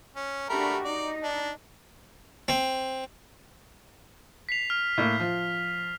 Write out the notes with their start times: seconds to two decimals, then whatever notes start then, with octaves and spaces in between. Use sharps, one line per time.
0.16 C#4
0.49 A3 D4 F#4 G4 A#4 B5
0.85 D#4 D5
1.23 D4
2.48 C4
4.49 B6 C7 F7
4.70 F6
4.98 A2 A#3
5.20 F3